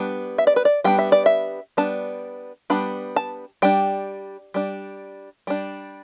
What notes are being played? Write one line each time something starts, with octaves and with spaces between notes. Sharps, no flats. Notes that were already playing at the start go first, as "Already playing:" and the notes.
Already playing: G3 B3 D4
E5
D5
B4
D5
G3 B3 D4 G5
E5
D5
E5
G3 B3 D4 A5
G3 B3 D4 B5
A5
G3 D4 G5
G3 D4
G3 D4